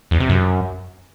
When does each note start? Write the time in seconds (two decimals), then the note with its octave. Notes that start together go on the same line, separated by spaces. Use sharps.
0.11 E2
0.20 C3
0.29 F#2